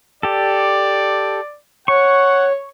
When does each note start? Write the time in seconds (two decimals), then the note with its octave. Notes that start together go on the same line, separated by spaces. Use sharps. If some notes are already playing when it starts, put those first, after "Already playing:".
0.23 G4 A4 D5
1.88 C#5 F#5 C#6